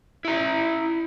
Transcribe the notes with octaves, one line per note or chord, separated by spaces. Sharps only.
E4 A#5